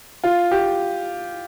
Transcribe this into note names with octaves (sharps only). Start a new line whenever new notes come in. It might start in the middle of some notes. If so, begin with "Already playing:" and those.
F4
G4